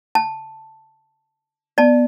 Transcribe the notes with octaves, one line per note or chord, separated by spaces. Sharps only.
A5
B3 D5 A5